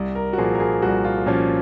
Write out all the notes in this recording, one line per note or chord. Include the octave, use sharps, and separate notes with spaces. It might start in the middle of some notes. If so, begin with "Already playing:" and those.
Already playing: C2
A#4
F#4
A#2 F3 G#4
A#4
G#4
C2 F#4
F4
A#2 F3 C#4